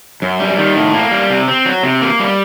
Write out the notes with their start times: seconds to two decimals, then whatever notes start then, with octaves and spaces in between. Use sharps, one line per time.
0.22 F#2
0.39 G3
0.58 D#3
0.76 A2
0.94 A#3
1.11 G3
1.30 C3
1.48 C4
1.65 F#3
1.83 C3
2.02 A#3
2.20 G3